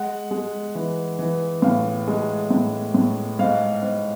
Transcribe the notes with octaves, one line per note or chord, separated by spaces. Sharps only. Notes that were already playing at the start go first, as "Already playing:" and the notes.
Already playing: G#3 F#5
G#3
E3
E3
A2 F5
G#3
A2
A2
G#2 F5
G#2